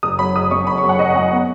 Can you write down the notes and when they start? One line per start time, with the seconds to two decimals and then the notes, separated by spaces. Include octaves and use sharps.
0.03 F#1 D#6
0.19 F#3 B5
0.36 F#1 D#6
0.51 F#2 C#6
0.67 F#1 B5
0.78 C#6
0.83 F#3
0.89 F#5
0.99 F#1 D#5
1.15 F#2 F#5
1.32 B3